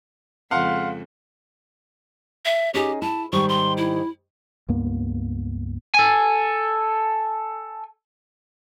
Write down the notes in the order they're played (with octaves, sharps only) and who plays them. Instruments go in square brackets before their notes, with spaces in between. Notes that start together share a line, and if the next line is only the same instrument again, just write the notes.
[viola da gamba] F2 C#3 G#3 [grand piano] F5 F#5 C6
[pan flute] E5
[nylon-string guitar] C#4 D#4 G#4 [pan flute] G4
[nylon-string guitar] E4 [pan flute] A5
[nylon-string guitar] G#2 D#3 G3 [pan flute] C#6
[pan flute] C6
E4
[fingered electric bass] C#2 G2 A#3 B3
[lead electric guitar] A4 G#5